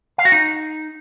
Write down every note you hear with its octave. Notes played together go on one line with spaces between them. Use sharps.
F5
F#4
D#4